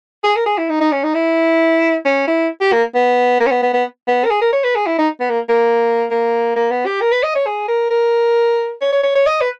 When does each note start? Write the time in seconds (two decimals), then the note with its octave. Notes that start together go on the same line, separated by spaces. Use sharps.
0.24 G#4
0.36 A#4
0.46 G#4
0.58 E4
0.69 D#4
0.81 D#4
0.92 C#4
1.04 D#4
1.14 E4
2.05 C#4
2.28 E4
2.61 G4
2.72 A#3
2.95 B3
3.40 A#3
3.47 C#4
3.51 B3
3.63 B3
3.74 B3
4.08 B3
4.25 A#4
4.30 G#4
4.41 A#4
4.53 C#5
4.64 B4
4.75 G#4
4.86 E4
4.98 D#4
5.20 B3
5.30 A#3
5.49 A#3
6.11 A#3
6.56 A#3
6.71 B3
6.86 G4
7.01 A#4
7.12 B4
7.23 D#5
7.35 C#5
7.46 G#4
7.68 A#4
7.91 A#4
8.81 C#5
8.93 C#5
9.04 C#5
9.15 C#5
9.27 D#5
9.41 B4